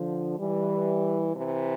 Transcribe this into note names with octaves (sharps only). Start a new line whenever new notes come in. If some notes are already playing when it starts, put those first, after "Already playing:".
Already playing: D3 F3
E3 G3
C3 E3